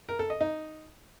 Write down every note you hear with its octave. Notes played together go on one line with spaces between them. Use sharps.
A#4
A4
D#5
D#4